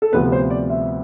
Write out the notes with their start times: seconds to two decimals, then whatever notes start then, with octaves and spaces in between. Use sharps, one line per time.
0.02 A4
0.12 D2 C3 F3 B3 B4
0.32 C5
0.50 D5
0.70 E5